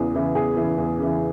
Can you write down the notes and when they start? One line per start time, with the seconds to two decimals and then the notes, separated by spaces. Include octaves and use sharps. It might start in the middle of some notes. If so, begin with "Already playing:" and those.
Already playing: E2 C#3 E3 G#4
0.15 C#3 E3
0.35 E2 G#4
0.57 C#3 E3
0.78 E2
0.99 C#3 E3